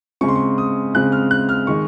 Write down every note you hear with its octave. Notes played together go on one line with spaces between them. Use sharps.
C#3 G#3 C4 C#6
C6
C#6
D#6
C#3 G#3 C4 F#6
F6
F#6
F6
D#3 G#3 C#6